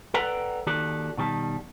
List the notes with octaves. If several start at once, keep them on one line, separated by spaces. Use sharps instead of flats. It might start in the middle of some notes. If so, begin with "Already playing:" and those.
A4 B4 D5 F#5 G5 A#5
D#2 D#3 F#4 G4 A4 D5
B2 D#3 G3 A5